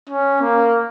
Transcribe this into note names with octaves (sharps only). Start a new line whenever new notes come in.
C#4
A#3